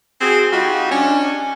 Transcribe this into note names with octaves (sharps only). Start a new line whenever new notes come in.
C4 F#4 G#4
G3 D#4 F4 F#4
C#4 D4